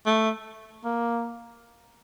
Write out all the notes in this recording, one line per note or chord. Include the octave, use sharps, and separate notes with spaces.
A3
A#3